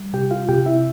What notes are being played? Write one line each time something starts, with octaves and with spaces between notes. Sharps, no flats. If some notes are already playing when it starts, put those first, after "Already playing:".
Already playing: G3
C3 G4 G5
F4 F5
C3 G4 G5
E4 E5